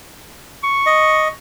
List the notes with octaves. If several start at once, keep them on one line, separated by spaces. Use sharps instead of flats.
C#6
D#5